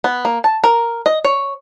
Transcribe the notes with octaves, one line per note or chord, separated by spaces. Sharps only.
B3
A#3
A5
A#4
D#5
C#5